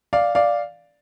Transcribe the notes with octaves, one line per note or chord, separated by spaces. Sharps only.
D5 F5
D5 F5